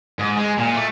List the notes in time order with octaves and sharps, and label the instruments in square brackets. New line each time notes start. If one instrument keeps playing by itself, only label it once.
[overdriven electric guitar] G#2
G#3
A#2
A3